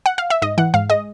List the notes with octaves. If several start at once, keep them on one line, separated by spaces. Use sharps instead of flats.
F#5
F5
E5
G#2 D#5
E3 F#5
G#2 F5
G#3 D#5